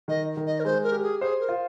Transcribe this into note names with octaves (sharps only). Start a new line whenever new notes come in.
D#3 D#5
D#3
D#5
A#4
G#3 C5
A#4
G4
G#4
G#4 C5
A#4
F4